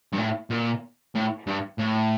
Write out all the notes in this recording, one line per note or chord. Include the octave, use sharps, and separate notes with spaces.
G2
A2
A#2
A2
G2
A2